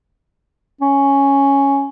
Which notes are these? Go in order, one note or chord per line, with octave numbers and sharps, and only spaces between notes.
C#4